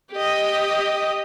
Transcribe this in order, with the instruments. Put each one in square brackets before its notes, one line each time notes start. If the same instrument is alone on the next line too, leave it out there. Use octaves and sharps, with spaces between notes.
[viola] G4 D#5